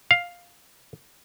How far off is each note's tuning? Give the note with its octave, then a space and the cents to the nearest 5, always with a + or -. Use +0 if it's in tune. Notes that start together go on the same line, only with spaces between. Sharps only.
F5 +5